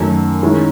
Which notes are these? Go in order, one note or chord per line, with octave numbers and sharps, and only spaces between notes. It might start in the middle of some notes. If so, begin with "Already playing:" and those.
Already playing: F#2 D#3 F#3 A3
D#3 G#3 C#4 E4